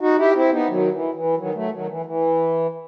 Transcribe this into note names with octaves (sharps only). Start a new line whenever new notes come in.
D#4 F#4
E4 G4
C4 E4
B3 D#4
D#3 F#3
E3
E3
D#3 F#3
F#3 A3
D#3 F#3
E3
E3